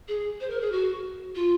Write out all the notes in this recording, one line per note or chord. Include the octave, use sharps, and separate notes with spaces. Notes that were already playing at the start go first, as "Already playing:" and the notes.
G#4
C5
A#4
G#4
F#4
F4